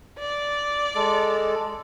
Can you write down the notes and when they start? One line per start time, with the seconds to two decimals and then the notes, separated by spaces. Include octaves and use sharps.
0.19 D5
0.96 G#3 A4